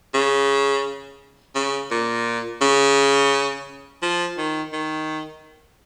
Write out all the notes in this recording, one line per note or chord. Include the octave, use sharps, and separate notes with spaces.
C#3
C#3
A#2
C#3
F3
D#3
D#3